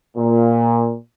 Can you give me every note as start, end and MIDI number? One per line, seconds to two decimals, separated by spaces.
0.17 0.94 46